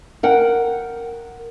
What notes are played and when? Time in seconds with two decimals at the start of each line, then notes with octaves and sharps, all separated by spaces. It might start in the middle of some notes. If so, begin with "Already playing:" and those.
0.23 A#4 F#5 G5